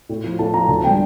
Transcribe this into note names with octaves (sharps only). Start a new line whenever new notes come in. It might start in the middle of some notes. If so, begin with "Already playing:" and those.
A2
F3
A2 A5
F3 A#5
D2 A5
D3 G3 G5